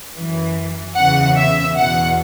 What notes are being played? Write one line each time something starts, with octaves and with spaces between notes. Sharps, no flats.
F#2 E3
E2 C#3 E3 F#5
E5
E2 B2 F#5